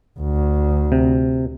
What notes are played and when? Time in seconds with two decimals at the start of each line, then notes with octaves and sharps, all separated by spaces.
0.20 D2
0.92 C3